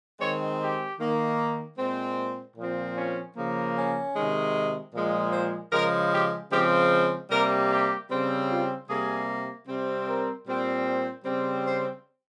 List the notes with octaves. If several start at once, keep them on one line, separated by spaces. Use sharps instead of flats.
D#3 G#3 C4 C#5
G4
D#3 A#3
A#2 G#3 C4
A#2 F3 C4
C#4
C#3 F3 A#3
C#4
C3 D#3 G#3
A#2 F3 G#3
C5
C#3 F3 G#3 A#4
G4
C#3 F3 G#3 C4 G4
C3 G3 A#3 A#4
G4
C#3 G3 C4
F4
C3 G3 A#3 G#4
C3 G3 C4
A#4
A#2 G3 C4
C5
C#3 G3 C4
C5